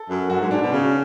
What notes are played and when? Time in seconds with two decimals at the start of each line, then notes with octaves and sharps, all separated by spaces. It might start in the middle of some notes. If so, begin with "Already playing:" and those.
Already playing: A4
0.09 F#2
0.30 F#2 F#4
0.40 G#2
0.51 G#2 D4
0.61 B2
0.72 C#3 C#4